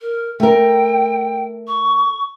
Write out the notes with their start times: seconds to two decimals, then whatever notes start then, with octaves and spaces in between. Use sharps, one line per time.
0.01 A#4
0.40 A3 A#4 G5
1.67 C#6